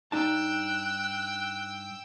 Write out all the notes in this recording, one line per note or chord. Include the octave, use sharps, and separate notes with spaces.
G2 D#4 G5 A5 E6 F#6